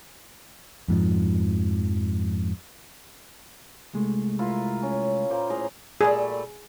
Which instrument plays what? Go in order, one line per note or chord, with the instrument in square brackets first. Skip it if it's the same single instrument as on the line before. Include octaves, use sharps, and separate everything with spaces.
[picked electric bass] F2 G#2 F3
[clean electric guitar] C2 G#3 A3
[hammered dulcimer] E4 F4 A#4
C#4
A#2 A#3 C5
A2 G#4 A#5
[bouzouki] A#2 G3 A3 [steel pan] G#4